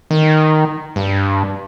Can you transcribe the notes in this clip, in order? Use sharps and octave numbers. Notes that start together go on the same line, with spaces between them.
D#3
G2